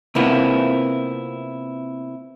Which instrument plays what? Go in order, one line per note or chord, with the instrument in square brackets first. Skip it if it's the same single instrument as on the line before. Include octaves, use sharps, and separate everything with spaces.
[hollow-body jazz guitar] C3 A#3 B3 E4 F4